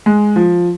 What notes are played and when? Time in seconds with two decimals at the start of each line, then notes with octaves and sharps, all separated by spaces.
0.06 G#3
0.36 F3